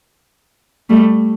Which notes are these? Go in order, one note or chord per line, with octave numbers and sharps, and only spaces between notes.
G3 A3